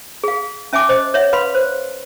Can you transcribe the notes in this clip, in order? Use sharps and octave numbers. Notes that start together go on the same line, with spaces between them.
G#4 F5
C#4 E5 G#5 A5 D6
C5 D#5
C#5 E5 F#5
B4 F5 B5 C6
C5